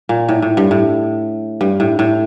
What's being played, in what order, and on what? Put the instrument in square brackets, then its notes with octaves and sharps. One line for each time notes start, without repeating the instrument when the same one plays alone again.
[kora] A#2
A2
A2
G2
A2
G2
A2
A2